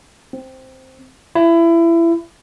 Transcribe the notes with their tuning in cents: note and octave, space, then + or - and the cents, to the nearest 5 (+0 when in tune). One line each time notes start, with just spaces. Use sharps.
C4 +0
E4 +25